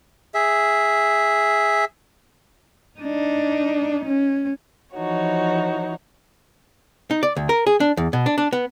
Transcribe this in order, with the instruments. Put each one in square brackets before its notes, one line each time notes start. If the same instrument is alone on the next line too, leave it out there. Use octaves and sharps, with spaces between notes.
[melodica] G#4 E5
[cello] D4 D#4
C#4
[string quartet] E3 F3 D#4 F#4 C#5
[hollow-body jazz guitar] D#4
D5
D2
A#4
G#4
D4
E2
B2
D4
D4
B3